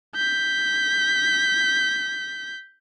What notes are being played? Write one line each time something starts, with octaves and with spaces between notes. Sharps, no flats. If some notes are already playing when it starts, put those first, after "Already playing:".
G6 B6